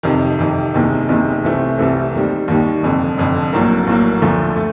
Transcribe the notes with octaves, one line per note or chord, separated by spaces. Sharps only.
F2 C3 D#3
F2 C3 D#3
F#1 E2 C3 D#3
F#1 E2 C3 D#3
C2 C3 E3 A3 C4
C2 C3 E3 A3 C4
D#2 D#3 G3
D#2 D#3 G3
F1 F2 D3
F1 F2 D3
A#1 A2 F#3 A#3
A#1 A2 F#3 A#3
D2 D3 F3 A3
A3